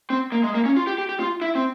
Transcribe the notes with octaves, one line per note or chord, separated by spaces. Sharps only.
C4
A#3
G#3
A#3
C#4
F4
G4
G4
G4
F4
E4
C4